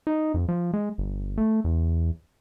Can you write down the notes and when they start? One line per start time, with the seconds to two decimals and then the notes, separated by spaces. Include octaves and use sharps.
0.07 D#4
0.34 F2
0.49 F3
0.74 G#3
0.98 G1
1.38 A3
1.64 E2